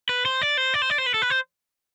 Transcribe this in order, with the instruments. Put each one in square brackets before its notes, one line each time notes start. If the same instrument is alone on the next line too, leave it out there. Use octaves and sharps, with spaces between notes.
[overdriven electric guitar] B4
C5
D5
C5
D5
C5
D5
C5
B4
A4
B4
C5